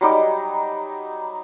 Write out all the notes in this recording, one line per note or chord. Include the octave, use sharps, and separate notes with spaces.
F#3 G3 D#4 D6